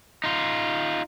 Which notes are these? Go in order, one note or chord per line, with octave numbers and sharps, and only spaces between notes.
D#4 F4